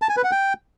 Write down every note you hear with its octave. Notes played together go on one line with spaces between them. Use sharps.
A5
G#5
B4
F#5
G5